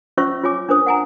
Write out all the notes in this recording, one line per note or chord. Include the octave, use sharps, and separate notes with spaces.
C#4 F4 C5 E5 C#6 E6
F4 C#5 G#5 D6
D4 A#4 C5 D#6
F#5 G#5 A#5